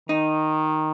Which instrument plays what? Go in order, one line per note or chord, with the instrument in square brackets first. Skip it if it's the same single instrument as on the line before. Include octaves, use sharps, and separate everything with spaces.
[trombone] D#3 [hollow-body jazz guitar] D#4